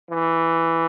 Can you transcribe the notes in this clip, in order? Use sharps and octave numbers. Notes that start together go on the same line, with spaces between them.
E3